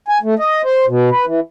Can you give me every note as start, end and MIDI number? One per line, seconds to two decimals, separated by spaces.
0.08 0.18 80
0.23 0.34 57
0.39 0.62 75
0.64 0.85 72
0.87 1.10 47
1.10 1.25 71
1.26 1.40 52